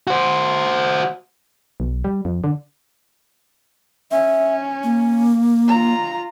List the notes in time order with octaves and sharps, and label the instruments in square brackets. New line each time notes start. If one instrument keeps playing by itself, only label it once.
[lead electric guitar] F#4 C5
[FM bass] B1
G3
F2
D3
[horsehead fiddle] C#4 [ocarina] E5
[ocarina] A#3
[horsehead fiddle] F4 A#5